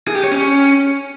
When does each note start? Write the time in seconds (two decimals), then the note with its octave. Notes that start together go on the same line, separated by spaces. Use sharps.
0.08 G#4
0.16 G4
0.24 C#5
0.32 C#4